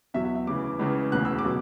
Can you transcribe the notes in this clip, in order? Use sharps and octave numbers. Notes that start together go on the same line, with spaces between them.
E2 B2 F#3 E5
E5
E5
D2 C#3 E3 D6
C#2 C#3 E3
E1 D2 C#3 E3 F#6
E6
D6
B2 F#3